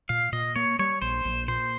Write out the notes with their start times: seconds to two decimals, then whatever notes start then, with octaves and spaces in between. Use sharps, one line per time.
0.09 A#2 F5
0.33 A#2 D#5
0.56 A#3 C#5
0.79 G3 C#5
1.02 A#1 C5
1.25 A#1
1.48 A#2 C5